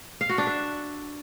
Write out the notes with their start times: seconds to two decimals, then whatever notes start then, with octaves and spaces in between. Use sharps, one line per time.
0.21 F5
0.29 F#4
0.38 D4
0.47 E5